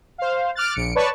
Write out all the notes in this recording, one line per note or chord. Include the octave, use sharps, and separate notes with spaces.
C5 F5
D6 F6 F#6 A6
A#1 C#7 D7
B4 C#5 D5 A5 C#6